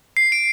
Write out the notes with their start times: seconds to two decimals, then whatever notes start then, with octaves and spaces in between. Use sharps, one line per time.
0.17 C7
0.32 D7